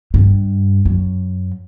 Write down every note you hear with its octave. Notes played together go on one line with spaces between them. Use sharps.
G2
F#2